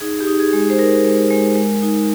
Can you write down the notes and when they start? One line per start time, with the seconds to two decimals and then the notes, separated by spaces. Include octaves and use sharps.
0.01 D#4 G#4
0.20 G4
0.27 D#4
0.40 G#4
0.53 G#3
0.70 C5
0.78 D#4 A#4
1.05 G#3
1.31 G#3
1.56 G#3
1.83 D#4